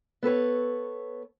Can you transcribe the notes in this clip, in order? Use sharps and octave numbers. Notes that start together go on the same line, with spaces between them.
B3 A4 B4 C#5